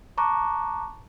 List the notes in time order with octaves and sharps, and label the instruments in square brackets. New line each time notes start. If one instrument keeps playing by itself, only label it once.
[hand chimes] A5 A#5 C#6 D6 F#6